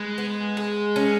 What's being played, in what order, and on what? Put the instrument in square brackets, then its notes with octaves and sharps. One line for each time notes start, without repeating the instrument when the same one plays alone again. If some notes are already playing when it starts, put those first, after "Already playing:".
Already playing: [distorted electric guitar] G#3 [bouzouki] B4
[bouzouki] B3
G#4
C#4